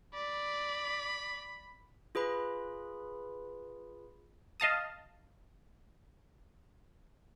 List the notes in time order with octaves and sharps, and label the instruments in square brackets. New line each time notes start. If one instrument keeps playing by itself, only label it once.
[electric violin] D5 [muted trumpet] B5
[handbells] F4 G#4 B4 B5
[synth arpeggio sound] D#5 F5 A5 D#6